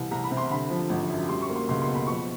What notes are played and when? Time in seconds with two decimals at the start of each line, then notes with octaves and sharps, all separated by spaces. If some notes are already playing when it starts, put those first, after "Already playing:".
Already playing: C2 E3
0.11 C2 A#5
0.24 B5
0.31 C3
0.37 C6
0.51 D3 B5
0.70 F3
0.89 G#1
1.10 F#2
1.28 G3 C6
1.42 C#6
1.49 A#3
1.56 C6
1.69 C#2 C6
1.82 C6
1.88 B2
1.94 B5
2.07 F3 C#6